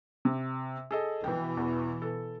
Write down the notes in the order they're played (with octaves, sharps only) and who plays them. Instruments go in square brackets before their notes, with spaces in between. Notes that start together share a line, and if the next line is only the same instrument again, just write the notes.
[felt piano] C3
G#4 A4 D#5
[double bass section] B2 E3 [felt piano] G5
[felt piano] E2
A4